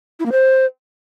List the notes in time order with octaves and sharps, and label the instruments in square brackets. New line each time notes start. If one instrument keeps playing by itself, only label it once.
[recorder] E4
A#3
C5